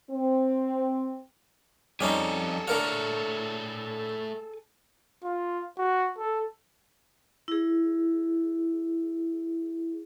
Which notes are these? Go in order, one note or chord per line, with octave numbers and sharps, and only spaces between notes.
C4
F2 G3 C#4 D#4 G#4 A4
D3 A3 A#4 C#5 F5
F4
F#4
A4
E4 G#4